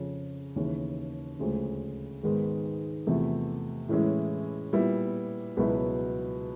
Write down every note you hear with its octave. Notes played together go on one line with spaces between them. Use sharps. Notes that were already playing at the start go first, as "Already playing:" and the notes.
Already playing: F2 C#3 F3
D#2 C#3 E3
D2 C#3 F3 G#3
G#2 D#3 G#3 B3
E2 C3 F3 A3
A2 E3 G#3 C#4 E4
A#2 G3 B3 E4
C#2 B2 F#3 B3 E4